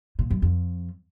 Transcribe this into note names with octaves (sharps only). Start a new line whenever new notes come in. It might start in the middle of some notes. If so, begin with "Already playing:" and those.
A#2
F#2
F2